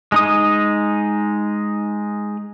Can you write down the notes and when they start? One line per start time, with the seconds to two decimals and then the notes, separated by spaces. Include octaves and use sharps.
0.12 G#3 D#4 D#6